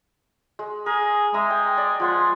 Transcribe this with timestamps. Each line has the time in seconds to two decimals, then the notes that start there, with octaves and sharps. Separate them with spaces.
0.59 G#3
0.86 G#4 A#4
1.34 G#3 E5 A#5 D#6
1.50 G5
1.78 D5
2.00 F3 G#3 F#5 C6